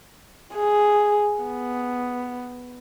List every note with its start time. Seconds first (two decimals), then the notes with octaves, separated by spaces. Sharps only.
0.56 G#4
1.41 B3